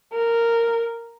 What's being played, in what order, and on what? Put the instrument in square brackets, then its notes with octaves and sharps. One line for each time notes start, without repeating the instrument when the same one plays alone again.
[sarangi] A#4